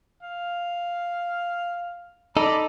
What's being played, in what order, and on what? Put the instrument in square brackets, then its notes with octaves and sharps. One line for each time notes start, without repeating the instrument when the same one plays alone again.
[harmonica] F5
[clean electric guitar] D#4 A4 [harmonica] D5 A#5 B5